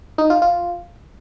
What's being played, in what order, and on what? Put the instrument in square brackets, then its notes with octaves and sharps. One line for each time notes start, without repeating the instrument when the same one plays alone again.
[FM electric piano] D#4
F4
F4